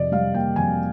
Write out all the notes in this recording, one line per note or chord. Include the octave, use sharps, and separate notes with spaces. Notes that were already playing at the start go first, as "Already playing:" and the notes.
Already playing: F2 C3 D5 D#5
G3 F5
A#3 G5
F2 G#5